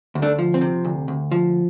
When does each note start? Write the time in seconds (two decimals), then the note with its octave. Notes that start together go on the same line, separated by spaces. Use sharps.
0.15 D2
0.22 A3 D4
0.38 F3
0.54 C4
0.61 C3
0.85 D2
1.08 D2
1.32 F3